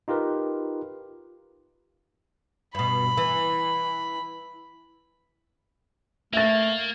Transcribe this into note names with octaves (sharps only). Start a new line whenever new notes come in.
D#4 F4 G4 A#4 B4
G2 B2 B5
E3
A3 A#3 E5 A6